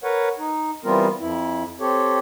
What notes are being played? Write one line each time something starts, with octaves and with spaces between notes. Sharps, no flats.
A#4 B4 C#5 F#5
D#4
E3 G3 B3 C4 F4 A#4
F2 E4
C4 G4 A4 C#5